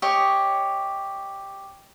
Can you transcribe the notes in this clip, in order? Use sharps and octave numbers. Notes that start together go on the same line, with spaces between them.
G4 C#5 D#5